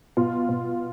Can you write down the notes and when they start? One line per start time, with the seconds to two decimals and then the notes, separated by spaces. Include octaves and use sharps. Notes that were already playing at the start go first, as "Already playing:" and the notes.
0.17 B2 F4
0.49 B2